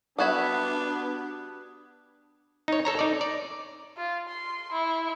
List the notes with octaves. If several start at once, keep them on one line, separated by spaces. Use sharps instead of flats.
G3 B3 D4 F#4 E5 D#6 F#6 G#6
D#4 C#5
A4 C#5 A#5
D#4 D5
D5
F4
C6
E4